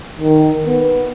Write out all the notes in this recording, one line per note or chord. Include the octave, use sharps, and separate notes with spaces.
D#3
B3